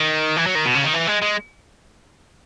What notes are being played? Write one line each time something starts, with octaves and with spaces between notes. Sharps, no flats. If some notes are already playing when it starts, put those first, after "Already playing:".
Already playing: D#3
E3
F#3
D#3
B2
C#3
D#3
E3
G#3
G#3